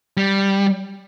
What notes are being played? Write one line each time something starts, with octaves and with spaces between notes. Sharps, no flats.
G3